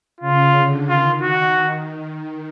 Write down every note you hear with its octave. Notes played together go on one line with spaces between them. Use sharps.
C#3 F4
D3
D#3 F4
F#4